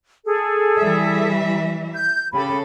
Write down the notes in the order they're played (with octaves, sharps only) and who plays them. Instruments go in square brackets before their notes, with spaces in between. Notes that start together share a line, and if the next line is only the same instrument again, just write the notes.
[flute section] G#4 A4
[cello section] E3 G3 E5
[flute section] G6
[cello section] C#3 A4 [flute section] G4 B5